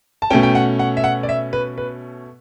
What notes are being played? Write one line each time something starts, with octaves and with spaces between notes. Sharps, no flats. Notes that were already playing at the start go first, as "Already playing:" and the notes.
A5
B2 A3 C#4 G5
G5
F#5
F#5
E5
F#5
D5
E5
B4
B4